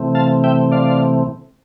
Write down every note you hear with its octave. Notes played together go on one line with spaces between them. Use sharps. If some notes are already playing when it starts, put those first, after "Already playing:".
Already playing: C3 E3 A3 C4
F5 A5
E5 G5
D5 F5